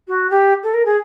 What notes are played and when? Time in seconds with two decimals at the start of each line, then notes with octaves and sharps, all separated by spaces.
0.07 F#4
0.30 G4
0.63 A4
0.73 A#4
0.85 G#4